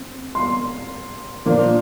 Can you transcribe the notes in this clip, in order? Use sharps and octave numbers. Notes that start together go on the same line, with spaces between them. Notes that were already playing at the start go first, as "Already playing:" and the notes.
Already playing: C4
C6
A#2 F3 A#3 D4